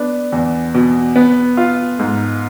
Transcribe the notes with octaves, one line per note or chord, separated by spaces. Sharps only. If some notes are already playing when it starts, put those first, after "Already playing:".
Already playing: B3 D4
E2
B2
B3
F4
G#2